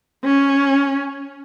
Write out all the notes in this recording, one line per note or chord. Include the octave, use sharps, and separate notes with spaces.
C#4